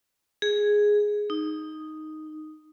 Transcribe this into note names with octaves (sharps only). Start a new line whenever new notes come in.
G#4
D#4